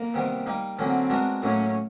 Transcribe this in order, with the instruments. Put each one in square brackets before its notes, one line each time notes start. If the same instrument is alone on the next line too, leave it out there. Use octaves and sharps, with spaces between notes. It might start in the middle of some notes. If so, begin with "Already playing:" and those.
Already playing: [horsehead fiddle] A#3
[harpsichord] C3 D#3 G3 B3
G3 A#3 D#4
[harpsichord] D3 F#3 A#3 C#4 [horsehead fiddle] C4
[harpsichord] G#3 B3 D4 F#4 A#4
[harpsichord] A2 F#3 A#3 [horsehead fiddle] C#4